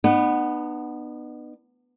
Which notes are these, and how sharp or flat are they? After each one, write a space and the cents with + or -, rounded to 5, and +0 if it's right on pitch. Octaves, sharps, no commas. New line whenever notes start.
B3 +0 D#4 -45